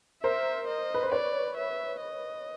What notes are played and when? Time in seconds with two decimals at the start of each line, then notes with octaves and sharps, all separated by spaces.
0.23 A#4 C5 E5
0.67 D#5
0.94 B4
1.03 C5
1.12 B4 C#5 D5
1.57 E5
2.01 D#5